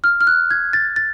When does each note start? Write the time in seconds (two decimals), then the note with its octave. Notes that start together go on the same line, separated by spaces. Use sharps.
0.04 F6
0.21 F6
0.27 F#6
0.51 G#6
0.73 A6
0.96 A6